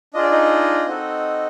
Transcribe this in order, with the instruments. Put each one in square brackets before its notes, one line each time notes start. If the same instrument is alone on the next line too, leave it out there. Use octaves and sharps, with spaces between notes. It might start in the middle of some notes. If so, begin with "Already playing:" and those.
[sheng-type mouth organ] D4 F4 G#4 D#5
D5
D#4 D#5
C4 D#4 F#4 A4